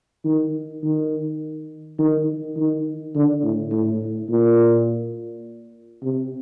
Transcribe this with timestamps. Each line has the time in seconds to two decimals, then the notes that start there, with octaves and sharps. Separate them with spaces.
0.25 D#3
0.83 D#3
1.98 D#3
2.56 D#3
3.15 D3
3.43 A2
3.72 A2
4.30 A#2
6.03 C3